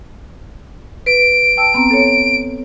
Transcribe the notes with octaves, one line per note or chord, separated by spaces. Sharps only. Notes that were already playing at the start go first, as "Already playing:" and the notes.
B4 D7
G5 A5 E6
B3 C4 A#5
A4 C#5